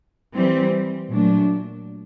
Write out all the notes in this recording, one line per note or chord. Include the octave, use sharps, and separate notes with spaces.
E3 G3 C4
A#2 F#3 A3 D4